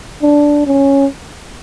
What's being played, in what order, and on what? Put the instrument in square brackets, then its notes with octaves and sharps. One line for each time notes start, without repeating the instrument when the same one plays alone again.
[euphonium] D4
C#4